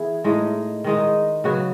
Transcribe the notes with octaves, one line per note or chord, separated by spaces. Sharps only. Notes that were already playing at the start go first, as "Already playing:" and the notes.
Already playing: E3 B3 G#4
A2 G#3 D#4
D#3 G#3 D#4
C#3 F#3 B3 F#4